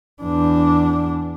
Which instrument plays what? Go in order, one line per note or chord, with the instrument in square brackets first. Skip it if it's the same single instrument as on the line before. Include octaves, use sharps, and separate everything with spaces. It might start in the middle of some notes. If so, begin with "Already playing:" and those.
[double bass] E2 D4